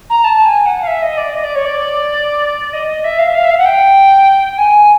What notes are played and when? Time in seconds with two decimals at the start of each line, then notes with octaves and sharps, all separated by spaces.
0.09 A#5
0.24 A5
0.45 G#5
0.66 F#5
0.81 F5
0.87 E5
1.02 D#5
1.17 D5
1.33 D#5
1.43 D5
1.55 C#5
1.65 D5
2.73 D#5
2.87 D#5
3.04 E5
3.18 F5
3.27 E5
3.34 F5
3.44 E5
3.50 F5
3.58 F#5
3.65 G5
4.58 G#5